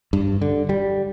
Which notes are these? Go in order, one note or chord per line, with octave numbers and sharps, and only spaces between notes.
G2
D3
G3